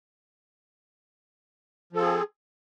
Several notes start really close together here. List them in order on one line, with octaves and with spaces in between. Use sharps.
F3 A4 C4 G#4